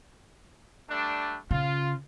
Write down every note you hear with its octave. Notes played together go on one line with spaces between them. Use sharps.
G3 A3 D4
C#3 F4